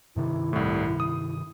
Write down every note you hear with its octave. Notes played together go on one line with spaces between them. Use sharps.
G2 C3 D#3 E4
C2 A2
D#6